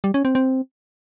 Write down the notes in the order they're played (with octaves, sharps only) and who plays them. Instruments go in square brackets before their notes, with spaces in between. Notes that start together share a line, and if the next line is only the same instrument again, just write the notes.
[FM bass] G3
C#4
C4
C4